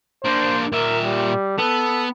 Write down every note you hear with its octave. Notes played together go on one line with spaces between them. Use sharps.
A#3 D4 C5
A#2 A#4 E5
G3
B3 A4